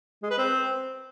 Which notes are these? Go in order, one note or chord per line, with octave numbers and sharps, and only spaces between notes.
G#3
B4
C4